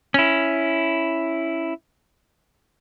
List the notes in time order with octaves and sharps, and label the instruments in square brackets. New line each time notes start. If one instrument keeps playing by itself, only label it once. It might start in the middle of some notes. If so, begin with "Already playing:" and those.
[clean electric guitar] C#4 E4